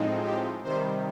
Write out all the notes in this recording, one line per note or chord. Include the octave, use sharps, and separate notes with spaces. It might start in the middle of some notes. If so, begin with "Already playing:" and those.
Already playing: A2 F3 G#3 C4 D#4
G4
C3 D#3 G3 C5